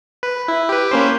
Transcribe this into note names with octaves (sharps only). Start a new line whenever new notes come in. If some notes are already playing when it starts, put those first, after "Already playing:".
B4
E4
G4 B4
A#3 C#4 C5